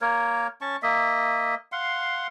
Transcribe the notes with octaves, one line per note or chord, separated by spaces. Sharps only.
A#3 A#4 C#5
C#4 A5 C#6
A#3 D#5 E5
F5 F#5 C6